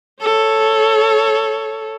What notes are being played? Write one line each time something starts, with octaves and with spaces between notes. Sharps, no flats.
A4 C#5